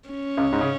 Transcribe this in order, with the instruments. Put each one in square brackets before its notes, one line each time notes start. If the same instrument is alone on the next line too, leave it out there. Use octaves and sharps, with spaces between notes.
[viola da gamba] C#4
[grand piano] C#2 C#3
G#2
C#3